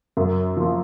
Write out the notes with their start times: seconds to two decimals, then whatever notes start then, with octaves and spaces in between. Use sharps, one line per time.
0.17 F#2
0.57 F3 A#3